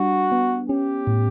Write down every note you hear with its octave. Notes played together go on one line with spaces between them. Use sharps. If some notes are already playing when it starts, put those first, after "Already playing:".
Already playing: G3 D4 F#4
B3
C#4 G4
A2